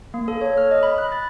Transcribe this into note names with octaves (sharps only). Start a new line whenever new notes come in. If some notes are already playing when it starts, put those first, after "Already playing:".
A#3
A4
C#5
F6
D#5
B5
F#6
A6